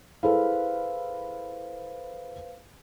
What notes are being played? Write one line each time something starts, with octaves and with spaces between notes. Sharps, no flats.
E4 G#4 A4 B4 C5 F5